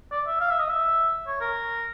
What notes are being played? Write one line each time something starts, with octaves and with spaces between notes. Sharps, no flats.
D5
E5
F5
E5
D#5
E5
C#5
A#4